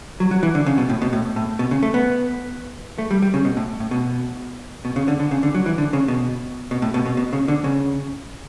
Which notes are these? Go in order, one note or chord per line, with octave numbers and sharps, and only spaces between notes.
F#3
F#3
E3
D3
C#3
B2
A2
B2
A2
A2
B2
C#3
A3
B3
A3
G3
G3
C#3
B2
A2
A2
B2
B2
C#3
D3
D3
C#3
D3
F#3
E3
D3
C#3
B2
B2
A2
B2
B2
B2
C#3
D3
C#3